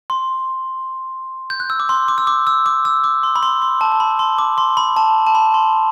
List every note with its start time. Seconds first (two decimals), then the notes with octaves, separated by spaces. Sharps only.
0.10 C6
1.50 G6
1.60 F#6
1.70 E6
1.80 D6
1.89 C6
2.08 D6
2.18 E6
2.27 D6
2.47 E6
2.66 D6
2.85 E6
3.04 D6
3.23 C6
3.36 B5
3.43 C6
3.62 C6
3.81 A5
3.92 A5
4.00 B5
4.19 C6
4.38 D6
4.58 C6
4.77 B5
4.96 A5
5.27 A5
5.35 B5
5.54 C6